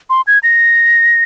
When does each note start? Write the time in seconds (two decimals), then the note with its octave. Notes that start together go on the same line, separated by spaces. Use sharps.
0.10 C6
0.27 G#6
0.43 A#6